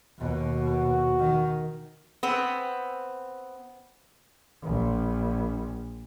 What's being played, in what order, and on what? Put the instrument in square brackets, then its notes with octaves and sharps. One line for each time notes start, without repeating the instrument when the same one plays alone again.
[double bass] D#2 B2
[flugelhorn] F#4
[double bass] D#3
[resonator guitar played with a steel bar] B3 C4
[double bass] A#1